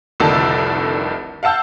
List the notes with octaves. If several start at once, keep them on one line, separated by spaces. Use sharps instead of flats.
F1 C2 D3 D#3 A4 A5
F5 F#5 A5 E6 G6